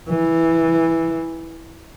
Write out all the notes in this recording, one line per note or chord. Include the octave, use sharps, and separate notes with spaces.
E3